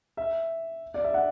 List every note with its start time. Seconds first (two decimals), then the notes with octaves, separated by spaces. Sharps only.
0.17 E5
0.94 D5
1.04 E5
1.14 F#5